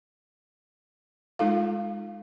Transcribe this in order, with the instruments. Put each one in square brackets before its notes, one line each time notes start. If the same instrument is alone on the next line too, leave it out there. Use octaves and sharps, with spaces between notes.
[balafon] G#3 D#4 F4 A4 F5